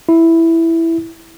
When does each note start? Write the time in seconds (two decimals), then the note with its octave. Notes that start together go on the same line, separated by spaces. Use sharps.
0.09 E4